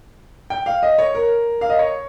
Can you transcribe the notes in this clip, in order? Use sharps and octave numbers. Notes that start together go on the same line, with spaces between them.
G5
F5
D#5
C#5
A#4
F5
D#5
C#5